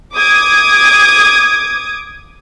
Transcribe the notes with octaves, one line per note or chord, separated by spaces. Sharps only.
D6 D#6 G#6